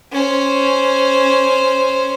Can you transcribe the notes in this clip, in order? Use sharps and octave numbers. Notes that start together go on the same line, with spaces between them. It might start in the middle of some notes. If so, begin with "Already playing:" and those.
C#4 C5